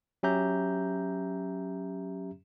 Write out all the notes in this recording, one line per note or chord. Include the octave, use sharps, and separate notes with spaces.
F#3 C#4 G4 E5 A#5 G6